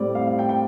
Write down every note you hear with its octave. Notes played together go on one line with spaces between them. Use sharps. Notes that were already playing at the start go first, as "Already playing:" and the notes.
Already playing: A2 G3 C4 D5
F5
F5
G5
G5